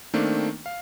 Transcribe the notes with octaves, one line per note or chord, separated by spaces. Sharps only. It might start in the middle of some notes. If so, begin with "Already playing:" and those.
D#3 A3 A#3 C4 D4
F5